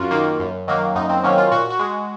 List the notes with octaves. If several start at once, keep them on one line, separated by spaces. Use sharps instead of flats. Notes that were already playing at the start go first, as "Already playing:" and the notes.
Already playing: F#2 F4 F#4 A#4
D#3 A#3
F#2
D#3 F#3 A#3
F#2 D#4
C4
D#3 F#3 A#3 C#4
F4
A#2 F#4
F#4
G#3